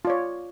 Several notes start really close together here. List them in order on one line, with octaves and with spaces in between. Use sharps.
F4 D5 C#5